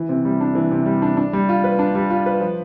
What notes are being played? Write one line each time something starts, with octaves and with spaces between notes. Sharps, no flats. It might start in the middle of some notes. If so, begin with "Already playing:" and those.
Already playing: E3
C3
G3
D4
E3
C3
G3
D4
D4
G3
F4
B4
D4
G3
F4
B4
F3